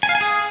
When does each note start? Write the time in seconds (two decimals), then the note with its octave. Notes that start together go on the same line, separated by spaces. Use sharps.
0.03 G#5
0.09 F5
0.15 G#5
0.21 G#4